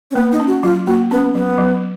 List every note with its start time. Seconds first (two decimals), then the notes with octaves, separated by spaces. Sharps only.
0.11 C#4
0.15 A#3 B3
0.32 D#4
0.40 C#4
0.47 F#4
0.63 F#3 F4
0.87 A#3 F#4
1.11 B3 C#4
1.35 F#3 B3
1.58 F#3